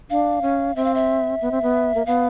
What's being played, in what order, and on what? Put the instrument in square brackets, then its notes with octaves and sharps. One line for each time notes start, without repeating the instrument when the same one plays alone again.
[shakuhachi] D4 [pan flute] F5
[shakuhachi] C#4
[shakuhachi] C4 [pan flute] E5
[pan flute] F5
E5
[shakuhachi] B3
C4
B3
A#3
[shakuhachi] B3 [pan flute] F5